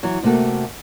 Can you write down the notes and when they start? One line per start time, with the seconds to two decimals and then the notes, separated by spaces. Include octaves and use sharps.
0.03 E3 F#3
0.23 C3 A3 A#3 F#4 A4